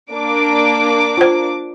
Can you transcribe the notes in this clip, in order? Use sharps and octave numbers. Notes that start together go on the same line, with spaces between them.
A#3 D4 D6
F4 C5